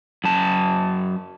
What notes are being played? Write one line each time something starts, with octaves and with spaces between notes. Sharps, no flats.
F#2 A5